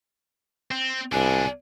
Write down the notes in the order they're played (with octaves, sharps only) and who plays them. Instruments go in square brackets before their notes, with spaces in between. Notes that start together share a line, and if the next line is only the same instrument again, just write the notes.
[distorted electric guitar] C4
[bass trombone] C2 [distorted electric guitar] B2 D4 [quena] G#5